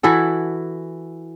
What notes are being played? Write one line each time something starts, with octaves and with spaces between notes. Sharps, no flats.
E3 E4 F#4 A4